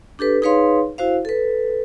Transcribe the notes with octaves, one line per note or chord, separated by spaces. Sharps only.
D4 G4 A4 B4
D#4 G#4 B4 C#5 F5 C6
E4 F#4 C5 F5
A4 B4